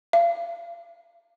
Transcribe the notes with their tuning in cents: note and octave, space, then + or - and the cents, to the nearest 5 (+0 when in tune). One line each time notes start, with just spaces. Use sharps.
F5 -35